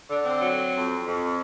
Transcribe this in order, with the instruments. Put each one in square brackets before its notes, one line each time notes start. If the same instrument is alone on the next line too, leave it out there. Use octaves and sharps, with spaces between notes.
[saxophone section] D3 D4
C4
F#3
F2
F2